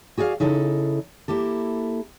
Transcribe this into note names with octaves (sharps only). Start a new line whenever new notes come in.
F#4 G#4 D5 D#5 F5
C#3 D#4 E4 A4
A#3 E4 G4 A4